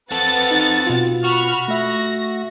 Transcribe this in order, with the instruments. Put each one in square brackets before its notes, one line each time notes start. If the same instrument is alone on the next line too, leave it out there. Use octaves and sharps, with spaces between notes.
[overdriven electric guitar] C4 A4 [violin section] B4 F#5 A6
[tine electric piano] D#4
B2 F4
[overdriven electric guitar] F#4 [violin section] B5 C#6 F6
[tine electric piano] A3 E5 [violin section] A#6